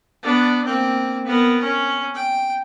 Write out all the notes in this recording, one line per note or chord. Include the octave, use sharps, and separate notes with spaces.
B3 D4
A#3 C4
B3 A#4
C#4
G5